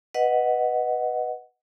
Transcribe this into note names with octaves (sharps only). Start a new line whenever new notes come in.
B4 D#5 F#5